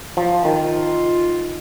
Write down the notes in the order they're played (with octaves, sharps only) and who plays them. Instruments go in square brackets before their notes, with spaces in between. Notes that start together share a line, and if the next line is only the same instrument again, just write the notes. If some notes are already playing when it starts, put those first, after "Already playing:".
[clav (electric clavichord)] F3
[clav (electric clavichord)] D#3 [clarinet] F4